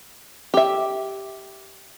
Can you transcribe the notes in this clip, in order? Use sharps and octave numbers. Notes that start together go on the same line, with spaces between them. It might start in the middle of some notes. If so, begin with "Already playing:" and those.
G4 E5